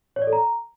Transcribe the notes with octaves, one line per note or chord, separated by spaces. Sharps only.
C#5
D5
A4
A#5